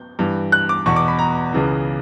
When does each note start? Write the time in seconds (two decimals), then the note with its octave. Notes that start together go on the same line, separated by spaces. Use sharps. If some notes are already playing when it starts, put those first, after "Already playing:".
Already playing: G6
0.19 G2 E3
0.52 F#6
0.69 D6
0.86 E2 B2 C#6
0.96 D6
1.08 B5
1.19 A#5
1.53 C#2 C#3 E3